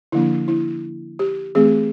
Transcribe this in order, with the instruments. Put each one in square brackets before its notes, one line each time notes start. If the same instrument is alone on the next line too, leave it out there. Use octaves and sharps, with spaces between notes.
[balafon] D3 F3 A#3 D4 E4
E4
G4
E3 A3 C4 G#4